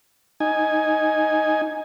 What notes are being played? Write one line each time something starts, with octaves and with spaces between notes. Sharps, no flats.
D#4 G#5